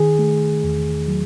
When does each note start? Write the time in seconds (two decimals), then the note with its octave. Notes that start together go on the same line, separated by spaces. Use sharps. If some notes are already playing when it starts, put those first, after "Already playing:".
Already playing: D#3 G#4
0.19 A3
0.64 E2
1.08 F#3